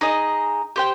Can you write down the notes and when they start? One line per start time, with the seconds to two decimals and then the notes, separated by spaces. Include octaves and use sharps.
0.01 D#4 G#4 D#5
0.76 G4 C5 G5